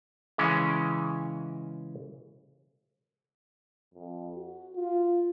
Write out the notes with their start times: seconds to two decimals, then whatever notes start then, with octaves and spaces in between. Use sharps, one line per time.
0.38 C#3 E3 G#3 C#4
3.94 F2
4.35 F#4
4.75 F4